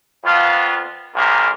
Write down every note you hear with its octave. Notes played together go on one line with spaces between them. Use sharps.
F2 B3 F4
B1 C3 D#3 G#3 A#4